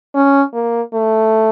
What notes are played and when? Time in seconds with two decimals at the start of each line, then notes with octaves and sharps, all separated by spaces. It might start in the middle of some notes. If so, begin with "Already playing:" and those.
0.15 C#4
0.54 A#3
0.94 A3